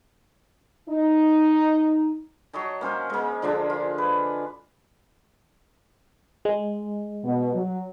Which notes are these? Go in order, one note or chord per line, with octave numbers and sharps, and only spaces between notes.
D#4
F#3 C#5 D#5 A5
A#3 C#4 C5 D#5
G#3 A#3
D3 F3 G#3 D4
F4
B4
G#3
B2
F#3